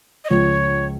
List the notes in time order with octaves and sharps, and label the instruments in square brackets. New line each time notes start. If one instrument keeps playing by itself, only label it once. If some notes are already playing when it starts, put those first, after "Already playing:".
[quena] D#5
[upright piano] C#2 C#3 F3 G#3 [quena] C#5